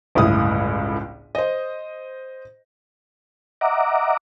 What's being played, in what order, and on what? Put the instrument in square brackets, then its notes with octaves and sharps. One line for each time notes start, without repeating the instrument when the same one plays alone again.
[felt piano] G1 C#2 A2 E4 D#6
C5 D#5
[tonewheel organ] D#5 E5 F#5 A#5 D6